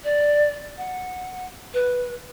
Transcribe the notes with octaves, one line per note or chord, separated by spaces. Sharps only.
D5
F#5
B4